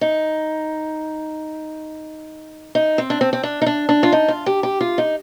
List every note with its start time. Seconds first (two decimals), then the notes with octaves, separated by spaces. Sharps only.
0.01 D#4
2.75 D#4
2.98 C4
3.10 D4
3.21 C4
3.33 C4
3.43 D4
3.62 D#4
3.66 D4
3.89 D4
4.03 F4
4.12 D#4
4.28 F4
4.46 G4
4.63 G4
4.81 F4
4.98 D#4